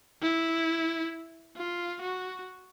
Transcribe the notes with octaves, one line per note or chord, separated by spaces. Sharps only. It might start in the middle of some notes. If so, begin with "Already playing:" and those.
E4
F4
F#4